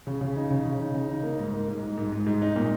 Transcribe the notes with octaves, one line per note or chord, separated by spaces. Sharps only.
C#3
C#3
D#4
C#3
C#3
D#4
C#3
D#4
A#3
G#2
A#3
G#2
G#2
G#2
G#2
G#2
D#4
A#2